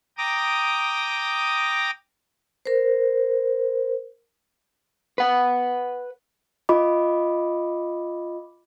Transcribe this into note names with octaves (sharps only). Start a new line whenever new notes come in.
G5 A#5 D6 D#6
A#4 C5
B4 F#5
F4 D#5 B5 D6